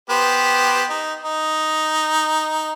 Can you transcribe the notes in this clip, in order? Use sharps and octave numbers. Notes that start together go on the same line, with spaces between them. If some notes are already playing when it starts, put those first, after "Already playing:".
B3 G4 C5
D#4
D#4